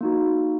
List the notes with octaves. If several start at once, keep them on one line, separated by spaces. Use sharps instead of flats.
A#3 D#4 F#4